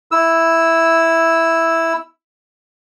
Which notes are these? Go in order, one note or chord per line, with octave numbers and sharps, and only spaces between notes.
E4 E6